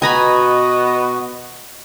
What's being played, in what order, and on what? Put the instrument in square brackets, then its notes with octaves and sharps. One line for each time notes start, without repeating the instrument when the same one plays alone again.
[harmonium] B2 F#4 [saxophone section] B3 D#5 [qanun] G#5 A#5 B5